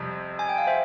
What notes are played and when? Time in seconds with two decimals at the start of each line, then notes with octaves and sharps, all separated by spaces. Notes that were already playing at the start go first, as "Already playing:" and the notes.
Already playing: F2 C3 G3
0.39 G#5
0.49 G5
0.58 F5
0.67 C5 E5